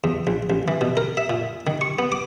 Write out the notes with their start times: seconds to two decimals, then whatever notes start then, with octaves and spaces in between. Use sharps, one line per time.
0.04 E2
0.27 A#1
0.50 A1
0.68 E3
0.81 B2
0.97 A#4
1.17 E5
1.30 A#2
1.67 D#3
1.81 C#6
1.99 B3
2.12 D6